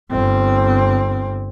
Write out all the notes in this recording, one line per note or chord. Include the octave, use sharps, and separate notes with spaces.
G1 C4